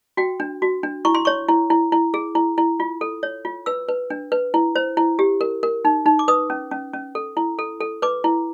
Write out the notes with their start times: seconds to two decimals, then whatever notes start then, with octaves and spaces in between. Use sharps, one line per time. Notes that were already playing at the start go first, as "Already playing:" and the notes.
0.17 F#4 G5
0.40 D4
0.62 F#4
0.83 D4
1.05 E4 C#6
1.15 C6
1.25 C#5 C#6
1.48 E4
1.70 E4
1.92 E4
2.14 G#4
2.35 E4
2.58 E4
2.80 F4
3.01 A4
3.23 C#5
3.45 F4
3.66 B4 E6
3.89 B4
4.10 D4
4.32 B4
4.54 E4
4.76 C5
4.97 E4
5.19 G4
5.41 A#4
5.63 A#4
5.85 D#4
6.06 D#4
6.19 D6
6.28 B4 D#6
6.50 C#4
6.71 C#4
6.93 C#4
7.15 A4
7.37 E4
7.59 A4
7.81 A4
8.02 B4 D6
8.24 E4